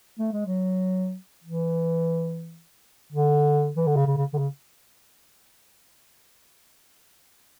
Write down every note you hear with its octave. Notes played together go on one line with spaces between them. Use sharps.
A3
G#3
F#3
E3
D3
E3
D3
C#3
C#3
C#3
D3
C#3